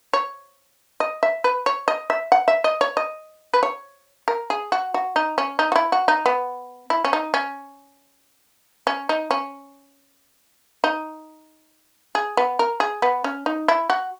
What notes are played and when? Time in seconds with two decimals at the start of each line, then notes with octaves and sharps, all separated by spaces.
0.13 C#5
1.00 D#5
1.23 E5
1.44 B4
1.66 C#5
1.88 D#5
2.10 E5
2.32 F#5
2.48 E5
2.64 D#5
2.81 C#5
2.97 D#5
3.54 B4
3.63 C#5
4.28 A#4
4.50 G#4
4.72 F#4
4.94 F#4
5.16 D#4
5.38 C#4
5.59 D#4
5.72 F#4
5.76 E4
5.92 F#4
6.08 D#4
6.26 B3
6.90 E4
7.04 C#4
7.13 D#4
7.34 C#4
8.87 C#4
9.09 D#4
9.31 C#4
10.84 D#4
12.15 G#4
12.37 B3
12.59 A#4
12.80 G#4
13.02 B3
13.24 C#4
13.46 D#4
13.68 E4
13.90 F#4